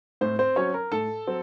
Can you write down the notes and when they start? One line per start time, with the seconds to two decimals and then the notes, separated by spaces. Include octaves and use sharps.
0.21 A2 C4 C5
0.39 C4 C5
0.56 F#3 C4 C#4 C#5
0.74 A#4
0.92 A2 A4 A5
1.27 F#3 C4